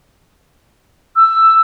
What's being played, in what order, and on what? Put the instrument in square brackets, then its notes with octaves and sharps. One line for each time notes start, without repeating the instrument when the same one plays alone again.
[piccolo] E6